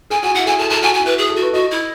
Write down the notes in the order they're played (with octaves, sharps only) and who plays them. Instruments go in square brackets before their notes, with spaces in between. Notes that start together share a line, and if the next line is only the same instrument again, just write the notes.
[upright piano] G#4 [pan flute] G#5
[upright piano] F#4 [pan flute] G#5
[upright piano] E4 [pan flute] F#5
[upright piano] G#4 [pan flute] G#5
[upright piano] A4 [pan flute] A5
[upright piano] A4 [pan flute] A5
[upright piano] F#4 [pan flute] G#5
[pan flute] G#5
[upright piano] E4
[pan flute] B4
G#4
[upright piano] A4
[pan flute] F#4
[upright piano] B4
[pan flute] F#4 [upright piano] D#5
[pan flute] E4